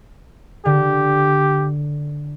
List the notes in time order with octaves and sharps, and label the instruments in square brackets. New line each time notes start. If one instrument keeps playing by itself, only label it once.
[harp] D3 [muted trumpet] G4